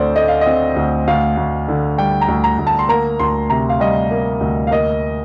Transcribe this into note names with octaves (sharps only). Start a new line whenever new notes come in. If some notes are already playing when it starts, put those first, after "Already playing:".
Already playing: D2 D3 C4 C5 D5
A3 D#5
F5
D#5
C4
D2
D2 F5
D2
D3
G3 G5
A#5
D2
A#5
D2
A5
C6
A#3 A#5
D2 C6
C3 A#5
F5
G3 D#5
A#3
D2
F5
A#3 D#5